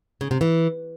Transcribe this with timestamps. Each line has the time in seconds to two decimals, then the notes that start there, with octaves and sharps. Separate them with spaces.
0.21 C#3
0.31 C3
0.41 E3